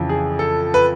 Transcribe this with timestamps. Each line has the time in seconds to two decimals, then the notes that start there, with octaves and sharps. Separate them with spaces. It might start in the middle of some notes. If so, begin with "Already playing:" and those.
Already playing: F2 C#3 E3
0.09 G#4
0.39 A4
0.74 B4